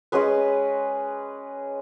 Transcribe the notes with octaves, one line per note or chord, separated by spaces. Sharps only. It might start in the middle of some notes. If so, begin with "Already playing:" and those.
G#3 C#4 G#4 B4